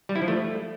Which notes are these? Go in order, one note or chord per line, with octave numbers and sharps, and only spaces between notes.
G3
E4
F3
A3